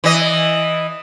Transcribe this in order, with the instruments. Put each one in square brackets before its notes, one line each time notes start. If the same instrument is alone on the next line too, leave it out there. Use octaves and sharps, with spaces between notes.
[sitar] E3 D#5